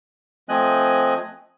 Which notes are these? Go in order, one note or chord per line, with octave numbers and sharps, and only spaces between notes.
F3 A3 C4 D#5 G#5 F#6